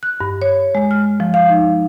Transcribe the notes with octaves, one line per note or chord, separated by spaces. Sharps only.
F#6
G2
C#5
G#3
F6
F3
F5
D#4